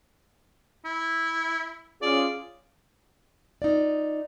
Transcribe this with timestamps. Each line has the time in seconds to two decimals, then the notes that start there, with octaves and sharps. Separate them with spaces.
0.85 E4
2.02 C#4 F4 G#4 D5
3.62 D#4 F4 D5